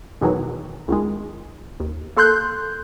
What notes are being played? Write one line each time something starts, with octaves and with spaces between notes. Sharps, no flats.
E2 B2 D#3 E3 F#3
C#2 D#3 G#3
D#2
A#3 A4 C6 F#6 G6